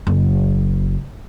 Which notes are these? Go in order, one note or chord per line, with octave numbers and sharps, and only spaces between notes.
F#1